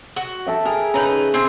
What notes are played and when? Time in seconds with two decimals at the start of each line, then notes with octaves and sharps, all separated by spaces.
0.16 F#4
0.47 A4 E5 G5
0.65 G#4 A#4
0.94 C#3 D#4 B4 A#5
1.34 C4 G#4